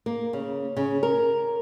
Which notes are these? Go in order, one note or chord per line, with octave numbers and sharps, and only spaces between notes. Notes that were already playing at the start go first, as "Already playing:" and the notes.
A#3
C#3
C#3
A#4